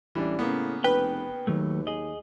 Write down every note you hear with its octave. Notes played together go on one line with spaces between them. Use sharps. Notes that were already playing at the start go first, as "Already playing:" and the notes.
A1 E3 G3 D4
A2 C#3 A#3 B3
F1 B4 G5
D#2 D#3 F#3 A3
G#4 D#5